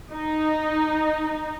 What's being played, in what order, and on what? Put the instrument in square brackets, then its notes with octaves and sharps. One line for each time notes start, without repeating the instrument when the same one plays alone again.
[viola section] D#4